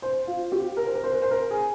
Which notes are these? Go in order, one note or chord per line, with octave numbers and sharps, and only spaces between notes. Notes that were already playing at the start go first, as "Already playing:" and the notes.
C5
F4
G4
A#4
C5
A#4
C5
A#4
C5
A#4
G#4